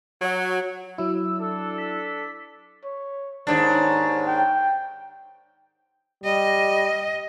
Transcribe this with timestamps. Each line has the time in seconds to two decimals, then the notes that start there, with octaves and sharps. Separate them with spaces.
0.21 F#3
0.98 F#3 E4 E6
1.38 D4 A4
1.78 B6
2.84 C#5
3.47 D#2 G#2 D4 C#5
4.27 G5
6.24 G3 D#5